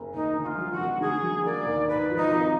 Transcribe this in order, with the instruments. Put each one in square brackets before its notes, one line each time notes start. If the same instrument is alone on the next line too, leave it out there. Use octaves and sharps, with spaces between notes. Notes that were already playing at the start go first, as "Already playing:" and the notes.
Already playing: [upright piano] F#1
[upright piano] D#2 [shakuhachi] D#4
[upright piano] D3
[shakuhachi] F#4
F4
[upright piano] F#3
[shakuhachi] F#4
[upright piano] F1
[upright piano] D3 [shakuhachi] G#4
[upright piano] F#3
[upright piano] A#3 [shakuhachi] D5
[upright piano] D#2
[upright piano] G#2 [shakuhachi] B4
[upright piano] F3
[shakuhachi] D#4
[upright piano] G#1